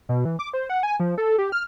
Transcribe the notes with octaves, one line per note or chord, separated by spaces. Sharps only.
B2
E3
D6
C5
F#5
G#5
F3
A4
G4
F6